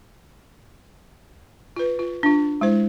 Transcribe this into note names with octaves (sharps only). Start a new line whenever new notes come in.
F4 B4
F4
D4 F4
G#3 E4 C5